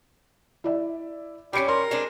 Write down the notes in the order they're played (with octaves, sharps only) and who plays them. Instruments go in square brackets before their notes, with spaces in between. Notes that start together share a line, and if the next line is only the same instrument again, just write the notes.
[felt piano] E4 D5 E5
[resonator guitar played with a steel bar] G3 B3 C#4 [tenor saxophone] G4 [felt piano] B5 C7 C#7
[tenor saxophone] A#4 [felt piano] C6
[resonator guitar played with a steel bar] G#3 C4 D4